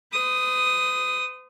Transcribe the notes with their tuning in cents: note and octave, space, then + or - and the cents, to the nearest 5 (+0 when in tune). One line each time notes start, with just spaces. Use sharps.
C5 -45 D#6 +0